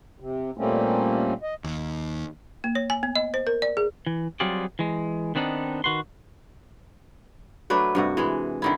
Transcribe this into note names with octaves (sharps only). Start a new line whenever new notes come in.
C3
A#2 G3 A3 A#3 C4 C#4
D#5
D#2
A#3
C#5
G#5
B3
D#5
C5
A#4
D5
G#4
E3
F#3 G3 C4 F4 G#4 D5
E3 G#3
D#3 B3 C4 D4 D#4
D#3 F#4 B4 C6
F#3 A3 D4 B4
G2 C3 F#4
E3 G#3
D3 D#3 E4